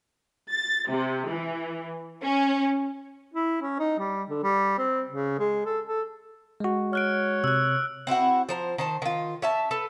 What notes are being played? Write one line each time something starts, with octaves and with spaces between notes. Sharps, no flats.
A6
C3
E3
C#4
E4
C#4
D#4
G3
D3
G3
C4
C#3
G#3
A4
A4
G#3 F#4
C#5 F6 F#6 D7
C3 E6 F#6
C4 E4 F#4 F#5
F3 C5 A#5
D#3 C5 A5
D#3 F4
C#4 E5 A5
A4 B4